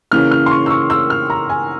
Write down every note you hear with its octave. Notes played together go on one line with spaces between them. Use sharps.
C#3 E3 A#3 C#4 F6
F6
C6
C#6
E6
C#6
E6
F6
A#5
G#5